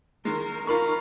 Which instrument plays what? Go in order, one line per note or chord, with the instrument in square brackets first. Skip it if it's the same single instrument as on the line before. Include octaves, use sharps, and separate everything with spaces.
[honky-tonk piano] D#3 G#3 [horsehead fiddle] A#4
[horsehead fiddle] D#4 A#5 [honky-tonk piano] F4 B5 C#6 [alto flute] A#4